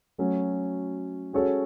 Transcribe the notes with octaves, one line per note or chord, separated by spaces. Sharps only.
F#3 A3 C#4
G#3 C#4 F#4 A4 C#5